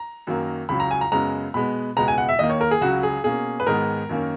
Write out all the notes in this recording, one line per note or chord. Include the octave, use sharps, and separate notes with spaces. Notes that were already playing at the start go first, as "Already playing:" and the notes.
Already playing: A#5
F#2 D#3 F#3 A#3
C#2 C#3 F#3 B5
A#5
G#5
A#5
F#2 C#3 G#3 B3 A#5
B2 G#3 B3 B5
C#2 B2 G#3 B3 A#5
G#5
F#5
E5
D#2 D#3 A#3 D#5
C#5
A#4
G#4
C#2 C#3 F#3 F#4
G#4
B2 A#3 C#4 G#4
B4
G#2 D#3 G#3 B3 A#4
F#2 D#3 A#3 C#4